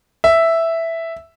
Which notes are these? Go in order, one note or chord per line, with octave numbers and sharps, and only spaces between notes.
E5